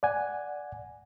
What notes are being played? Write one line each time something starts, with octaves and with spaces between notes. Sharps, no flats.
D5 F#5 G#5